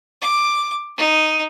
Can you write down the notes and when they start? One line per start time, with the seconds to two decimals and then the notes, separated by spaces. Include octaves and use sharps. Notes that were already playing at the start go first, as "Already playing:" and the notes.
0.21 D6
0.97 D#4